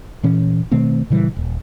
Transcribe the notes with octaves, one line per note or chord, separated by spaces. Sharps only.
A#2 E3 C#4
B2 D#3 A3 C4
A#2 C#3 E3 G3
D#1